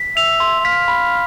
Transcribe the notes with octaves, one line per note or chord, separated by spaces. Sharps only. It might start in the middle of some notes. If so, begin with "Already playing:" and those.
Already playing: B6
E5 F7
C6
E5
F5 B6
B5